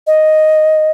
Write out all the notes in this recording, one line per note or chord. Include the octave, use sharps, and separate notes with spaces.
D#5